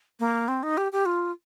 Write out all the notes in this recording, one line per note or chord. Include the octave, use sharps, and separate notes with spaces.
A#3
C4
D#4
G4
G4
F4